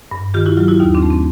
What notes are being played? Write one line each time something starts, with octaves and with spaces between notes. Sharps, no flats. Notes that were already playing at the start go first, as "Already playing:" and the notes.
G2
D#3 F4 G4
E4 F#4
F#3 F4 G4
E4 F#4
D#2 D#4 F4
C4 D4
A3
C4